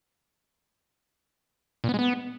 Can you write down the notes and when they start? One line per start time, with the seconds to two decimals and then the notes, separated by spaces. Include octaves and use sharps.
1.84 A#2
1.89 B3
1.94 G#3
1.99 B3